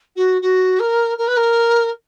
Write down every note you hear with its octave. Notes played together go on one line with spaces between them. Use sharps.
F#4
F#4
A#4
A#4
B4
A#4